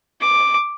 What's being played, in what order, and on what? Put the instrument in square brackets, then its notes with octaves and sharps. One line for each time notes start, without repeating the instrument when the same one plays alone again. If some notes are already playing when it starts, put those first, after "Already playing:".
[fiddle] D6